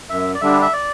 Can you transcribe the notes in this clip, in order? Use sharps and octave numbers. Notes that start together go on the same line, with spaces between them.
F#2 E5
D5
D3 G3 D4 E5
E5
D5